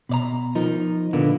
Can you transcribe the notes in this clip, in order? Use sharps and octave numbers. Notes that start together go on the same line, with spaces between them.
B2 D5 A#5
F3 D#4 A#4
A#2 D3 A#3 B3